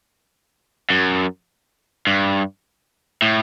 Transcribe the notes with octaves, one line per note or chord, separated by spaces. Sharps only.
F#2
G2
A2